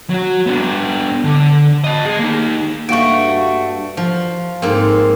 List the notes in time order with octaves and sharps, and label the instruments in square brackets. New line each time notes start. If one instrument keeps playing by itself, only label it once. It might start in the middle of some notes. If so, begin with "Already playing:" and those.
[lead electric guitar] F#3 F#4
B3 D4
D3
D#5 A5
G#4 D#5
A#3 D#4
[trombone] G2 [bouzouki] A3 F#4 [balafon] A#3 F5 [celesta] C#6 D7
[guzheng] F3
G#2 A#3 C4